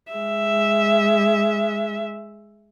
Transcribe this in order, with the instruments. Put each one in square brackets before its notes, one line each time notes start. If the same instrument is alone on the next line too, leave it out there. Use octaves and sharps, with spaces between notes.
[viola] G#3 E5